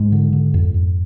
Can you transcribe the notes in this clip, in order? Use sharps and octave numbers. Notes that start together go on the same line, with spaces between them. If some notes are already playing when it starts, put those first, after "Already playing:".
Already playing: G#2 G#3
D3
D3
F2
F2